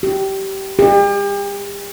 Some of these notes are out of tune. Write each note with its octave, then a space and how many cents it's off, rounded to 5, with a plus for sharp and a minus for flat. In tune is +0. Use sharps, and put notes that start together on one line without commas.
G4 -20
G4 +40